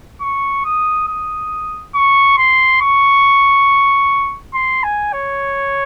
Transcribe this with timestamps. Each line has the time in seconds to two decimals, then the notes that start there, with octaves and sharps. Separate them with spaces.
0.21 C#6
0.65 D#6
1.08 D#6
1.95 C#6
2.38 C6
2.81 C#6
4.54 C6
4.84 G#5
5.13 C#5